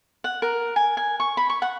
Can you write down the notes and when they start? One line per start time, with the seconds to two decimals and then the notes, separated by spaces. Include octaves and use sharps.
0.24 F#5
0.42 A#4
0.76 G#5
0.97 G#5
1.20 C#6
1.37 B5
1.50 C#6
1.62 F#5